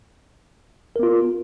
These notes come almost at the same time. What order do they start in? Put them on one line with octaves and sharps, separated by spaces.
A#4 B3 F4